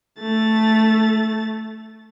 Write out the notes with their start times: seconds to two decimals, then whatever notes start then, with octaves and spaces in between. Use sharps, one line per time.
0.20 A3 A6